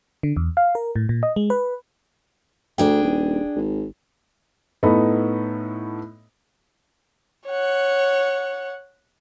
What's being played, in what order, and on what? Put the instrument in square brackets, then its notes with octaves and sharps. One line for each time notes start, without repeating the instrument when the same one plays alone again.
[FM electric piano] D3
E2
F5
A#4
A2
A#2
D#5
G#3
B4
[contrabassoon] D2 [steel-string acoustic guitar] D4 G#4 G5
[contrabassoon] D#1
G#1
[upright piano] A2 B3 D#4 A4 D#5 B5
[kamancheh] C#5 F#5